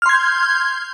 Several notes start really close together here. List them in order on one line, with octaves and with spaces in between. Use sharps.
F6 C6 G#6 G6